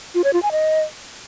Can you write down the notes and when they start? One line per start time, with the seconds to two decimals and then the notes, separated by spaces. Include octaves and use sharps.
0.15 F4
0.24 C#5
0.33 F4
0.43 G#5
0.52 D#5